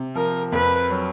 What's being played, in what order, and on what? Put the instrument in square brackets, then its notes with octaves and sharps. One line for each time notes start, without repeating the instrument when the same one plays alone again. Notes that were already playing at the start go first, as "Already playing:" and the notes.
Already playing: [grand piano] C3
[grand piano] F3 [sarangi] A#4
[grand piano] F2 [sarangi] B4
[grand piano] F#3